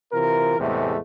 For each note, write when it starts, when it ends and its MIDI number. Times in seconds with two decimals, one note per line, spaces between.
0.13 0.59 48
0.13 0.59 52
0.13 0.59 65
0.13 0.59 70
0.59 0.97 40
0.59 0.97 45
0.59 0.97 48
0.59 0.97 56
0.59 0.97 57